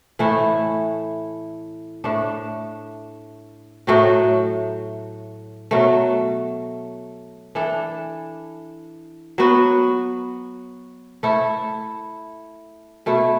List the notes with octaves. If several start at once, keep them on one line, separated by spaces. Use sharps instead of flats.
A2 E3 A3 E4
A2 A3 D4
A2 F#3 A3 F#4
B2 F#3 A3
E3 D4 A4
F#3 B3 F#4
A3 E4 A4
B2 A3 E4